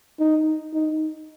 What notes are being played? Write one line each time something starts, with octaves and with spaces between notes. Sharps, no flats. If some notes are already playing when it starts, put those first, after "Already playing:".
D#4
D#4